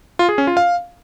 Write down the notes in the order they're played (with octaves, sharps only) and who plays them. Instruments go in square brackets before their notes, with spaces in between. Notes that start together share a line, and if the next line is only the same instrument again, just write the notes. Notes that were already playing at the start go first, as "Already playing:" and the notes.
[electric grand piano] F4
G#4
C#4
F4
F5